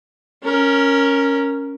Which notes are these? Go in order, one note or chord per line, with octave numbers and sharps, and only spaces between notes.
C#4 A#4